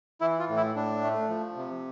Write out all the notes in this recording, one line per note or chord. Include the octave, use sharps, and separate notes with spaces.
E3 E4
F4
A2
E4
A2 D4
A3
F3
C3